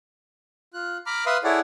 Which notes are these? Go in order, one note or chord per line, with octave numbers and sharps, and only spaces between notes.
F4 F#6
A#5 B5 D6 F6
B4 E5 F5 B5 C6 D#6
E4 G#4 A4 C#5 D5 F#5